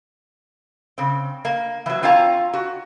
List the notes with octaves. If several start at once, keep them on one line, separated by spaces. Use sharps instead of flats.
C#3 C4
A#3
E3 F#3
C4 F4 C#5 F5 A5 A#5
F#4